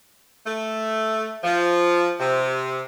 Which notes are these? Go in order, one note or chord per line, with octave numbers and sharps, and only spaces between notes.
A3
F3
C3